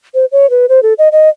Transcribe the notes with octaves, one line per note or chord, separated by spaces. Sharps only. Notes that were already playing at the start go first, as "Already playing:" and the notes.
C5
C#5
B4
C5
A4
D#5
D#5